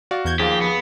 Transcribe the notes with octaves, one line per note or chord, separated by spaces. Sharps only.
F#4 D5 F5
E2 G6 G#6
D#2 F3 G4 G#4 F5
B3